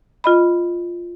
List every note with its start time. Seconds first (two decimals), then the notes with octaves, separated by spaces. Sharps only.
0.24 F4 D#5 B5